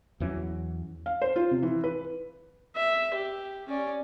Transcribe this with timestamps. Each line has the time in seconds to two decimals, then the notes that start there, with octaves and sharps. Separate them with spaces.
0.20 E2 E3 F#3 C#4
1.06 F5
1.22 C5
1.36 F4
1.51 C3
1.63 E3
1.84 B4
2.76 E5
3.14 G4
3.69 C#4 D5